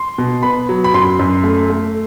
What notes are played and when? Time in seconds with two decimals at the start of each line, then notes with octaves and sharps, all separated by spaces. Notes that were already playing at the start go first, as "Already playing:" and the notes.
Already playing: C6
0.18 B2
0.43 B3 B5
0.69 F#3
0.84 B5
0.94 F#2 C6
1.19 F#2
1.44 A3
1.70 A3